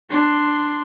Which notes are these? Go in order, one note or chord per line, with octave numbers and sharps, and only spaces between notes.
D4 C6